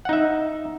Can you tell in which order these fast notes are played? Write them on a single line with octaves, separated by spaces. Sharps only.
F#5 D#4 E5